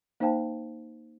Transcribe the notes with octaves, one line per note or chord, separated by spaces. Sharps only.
A#3 D#4 C5 F5 G5 A5